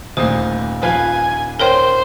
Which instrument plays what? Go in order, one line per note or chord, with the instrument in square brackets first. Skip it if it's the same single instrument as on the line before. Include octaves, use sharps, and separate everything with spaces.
[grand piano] D#1 [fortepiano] D2 A#2 D#6 [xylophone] C5
[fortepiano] F3 B4 F5 [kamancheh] G#5
[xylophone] A#4 C#5 G5 [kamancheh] C5